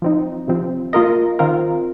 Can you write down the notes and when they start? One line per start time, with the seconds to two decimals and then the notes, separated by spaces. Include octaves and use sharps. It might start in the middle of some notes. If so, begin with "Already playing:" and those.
0.02 F3 C4 D#4
0.48 C3 F3 C4
0.93 A#3 F4 A#4 D#5
1.39 D#3 C4 F4 A#4